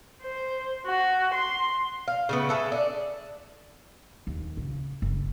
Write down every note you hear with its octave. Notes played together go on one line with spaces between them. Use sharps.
C5
F#4
C6
F5
C#3 A3 B3
G#4 A4 E5
D4
D#2
C#3
F#1